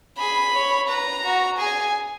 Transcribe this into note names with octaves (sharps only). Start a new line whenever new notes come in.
G#4 B5
C#5
B4 A#5
F#4
G#4 G#5